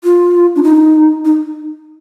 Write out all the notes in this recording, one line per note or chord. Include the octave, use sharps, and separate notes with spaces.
F4
D4
D#4
D#4